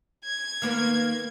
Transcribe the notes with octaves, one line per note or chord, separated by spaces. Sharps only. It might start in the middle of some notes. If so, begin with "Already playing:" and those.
G#6
D#3 A#3 B3